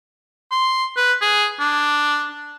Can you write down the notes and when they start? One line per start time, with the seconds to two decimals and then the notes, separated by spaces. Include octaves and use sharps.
0.51 C6
0.97 B4
1.21 G#4
1.60 D4